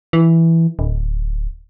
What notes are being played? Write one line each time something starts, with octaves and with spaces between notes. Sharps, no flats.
E3
D1